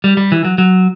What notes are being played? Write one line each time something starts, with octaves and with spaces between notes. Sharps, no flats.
G3
G3
E3
F#3
F#3